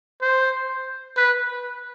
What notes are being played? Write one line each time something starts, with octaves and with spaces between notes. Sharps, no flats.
C5
B4